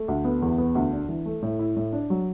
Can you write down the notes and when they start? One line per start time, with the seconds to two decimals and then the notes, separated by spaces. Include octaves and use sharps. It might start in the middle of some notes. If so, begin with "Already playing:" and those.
Already playing: A3
0.08 D2
0.25 B3
0.42 E2
0.58 B3
0.75 D2
0.92 D4
1.09 E3
1.26 A3
1.42 A2
1.59 E4
1.76 A2
1.93 D4
2.10 F#3